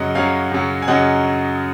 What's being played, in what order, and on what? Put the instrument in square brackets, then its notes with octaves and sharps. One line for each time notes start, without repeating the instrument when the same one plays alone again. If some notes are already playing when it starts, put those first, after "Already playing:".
Already playing: [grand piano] F#2 C#3 F#3 C#4 D#5 F#5
F#2 C#3 F#3 C#4 C#5 F5
F#2 C#3 F#3 C#4
G#5
F#2 C#3 F#3 C#4 D#5 F#5